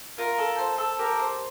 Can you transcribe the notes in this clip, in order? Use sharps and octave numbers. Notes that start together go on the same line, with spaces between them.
F4 A#4
A4
C5
A4
G4 A#4
C5